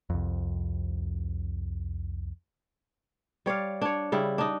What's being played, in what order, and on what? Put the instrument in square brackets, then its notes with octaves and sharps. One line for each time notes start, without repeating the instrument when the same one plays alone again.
[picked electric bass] C2 F2
[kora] G3 C#5 D5 F5
D4 C#5
C#3 G3 E4
D4 D#4